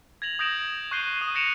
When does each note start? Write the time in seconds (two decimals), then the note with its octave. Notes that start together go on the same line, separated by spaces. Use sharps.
0.22 G#6 A#6 F7 F#7
0.39 D#6 G6 A#6 D7 E7 F#7
0.91 C#6 F#6 G6 C7 D#7 G7
1.21 D#6 D#7
1.35 F#6 A#6 C#7 D7 E7 F7